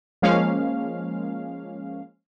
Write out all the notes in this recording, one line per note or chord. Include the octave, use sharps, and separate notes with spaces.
F3 G#3 A#3 C#4 F5